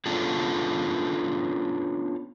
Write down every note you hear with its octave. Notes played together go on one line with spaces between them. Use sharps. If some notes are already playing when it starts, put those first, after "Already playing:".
B3 C#4 D4 F4 G#4 A4